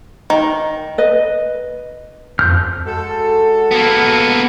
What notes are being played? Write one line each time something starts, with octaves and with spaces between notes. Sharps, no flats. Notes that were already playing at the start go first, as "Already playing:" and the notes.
D#3
B4 D#5
F2 A#4 F6 G6
G#3 F#4 A4
A#3 B3